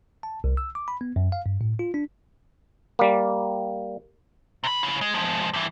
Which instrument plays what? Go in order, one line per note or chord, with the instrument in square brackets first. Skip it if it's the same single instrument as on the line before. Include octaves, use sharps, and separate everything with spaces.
[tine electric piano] A5
C2
E6
D6
B5
B3
F#2
F5
G2
A2
F4
D4
[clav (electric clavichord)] G3 A#3
[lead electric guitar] C3 B5
C#3 E4
G#3
F3 G#3
G2 E3